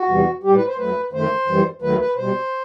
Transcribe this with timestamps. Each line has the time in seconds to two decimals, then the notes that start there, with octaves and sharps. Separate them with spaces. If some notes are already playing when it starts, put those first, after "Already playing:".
Already playing: F#4
0.08 E2 C3 E3 G3
0.43 A2 G3 G4
0.55 B4
0.67 C5
0.78 F#2 F#3 A3 B4
1.12 F#2 D#3 A3 C5
1.47 F#2 E3 G3
1.82 D#2 D#3 F#3 A3 B4
1.99 B4
2.16 B2 G3 C5